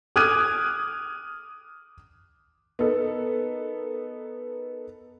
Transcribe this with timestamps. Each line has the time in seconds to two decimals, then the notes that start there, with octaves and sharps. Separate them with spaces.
0.16 D6 D#6 F6 F#6 G#6 D#7
2.79 B3 D#4 A4 A#4